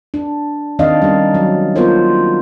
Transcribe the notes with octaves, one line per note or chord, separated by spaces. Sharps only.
D4
D#3 C4 D4 D5 D#5 F5
G3 C#4 D#4
F#3
A#3 B3 F4 A#4 C5 C#5